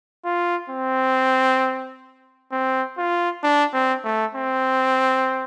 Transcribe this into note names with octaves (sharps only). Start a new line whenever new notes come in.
F4
C4
C4
F4
D4
C4
A3
C4